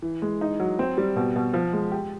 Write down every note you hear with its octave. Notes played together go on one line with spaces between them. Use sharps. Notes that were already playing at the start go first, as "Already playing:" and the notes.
E3
G#3
D#4
F#3
C4
G3
B2
B2
F3
G#3
G4